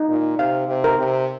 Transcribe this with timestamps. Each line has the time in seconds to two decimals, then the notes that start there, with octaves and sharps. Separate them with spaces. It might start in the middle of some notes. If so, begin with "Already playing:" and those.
Already playing: D#4
0.09 A#2
0.39 C3 F5
0.68 C3
0.84 A#4
0.99 C3